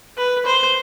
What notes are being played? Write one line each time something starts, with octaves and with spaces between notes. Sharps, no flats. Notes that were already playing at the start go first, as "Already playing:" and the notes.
B4
C5